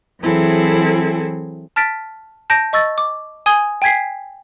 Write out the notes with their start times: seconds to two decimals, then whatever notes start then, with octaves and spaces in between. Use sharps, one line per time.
0.20 E3 F#3 C4 E4 G#4 A4
1.76 A5 F6 A6 B6 D7
2.50 A5 G6 A#6 D7
2.73 D#5 C#6 E6 A6
2.98 D6
3.46 G#5 D#6 G#6 G7
3.82 G5 G#5 G#6 B6 C7